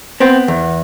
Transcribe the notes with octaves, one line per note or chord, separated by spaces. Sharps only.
B3 C4
E2